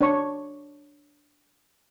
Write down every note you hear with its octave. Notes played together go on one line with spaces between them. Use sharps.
D4 C#5 C#6